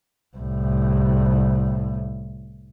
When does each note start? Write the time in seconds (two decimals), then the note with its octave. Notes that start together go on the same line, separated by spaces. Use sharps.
0.37 C2 A2